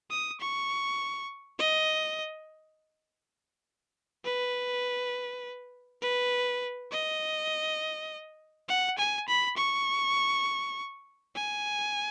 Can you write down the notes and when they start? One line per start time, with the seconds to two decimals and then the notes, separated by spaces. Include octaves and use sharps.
0.11 D#6
0.40 C#6
1.59 D#5
4.25 B4
6.02 B4
6.91 D#5
8.69 F#5
8.98 G#5
9.28 B5
9.57 C#6
11.35 G#5